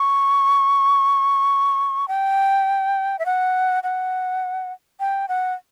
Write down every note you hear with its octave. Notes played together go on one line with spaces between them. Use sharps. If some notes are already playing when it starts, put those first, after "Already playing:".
Already playing: C#6
G5
E5
F#5
F#5
G5
F#5